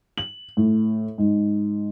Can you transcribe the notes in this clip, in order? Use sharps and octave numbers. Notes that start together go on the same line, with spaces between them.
F#7
A2
G#2